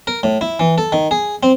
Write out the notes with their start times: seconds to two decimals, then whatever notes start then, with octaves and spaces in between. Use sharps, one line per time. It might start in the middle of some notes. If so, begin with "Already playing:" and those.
0.07 A#4
0.23 A2
0.41 E4
0.60 E3
0.78 A4
0.92 D#3
1.11 G#4
1.43 C4